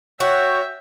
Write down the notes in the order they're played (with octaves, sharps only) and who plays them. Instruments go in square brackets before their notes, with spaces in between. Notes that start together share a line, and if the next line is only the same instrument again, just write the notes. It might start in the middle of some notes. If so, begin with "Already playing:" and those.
[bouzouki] F#4 [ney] C#5 [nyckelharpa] E5 [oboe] G5